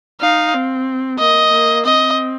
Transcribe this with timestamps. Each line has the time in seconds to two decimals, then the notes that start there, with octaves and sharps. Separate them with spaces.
0.21 D#4 F5
0.54 C4
1.19 A#3 D#5
1.51 A#3
1.84 C4 D#5